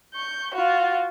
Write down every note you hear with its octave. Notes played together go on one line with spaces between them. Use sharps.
C#6 G6
F4 F#4